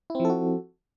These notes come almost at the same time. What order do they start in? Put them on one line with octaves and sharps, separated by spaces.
E4 C4 F3 A4 F#4